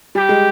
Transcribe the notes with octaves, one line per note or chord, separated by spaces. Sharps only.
G3 G4
G#3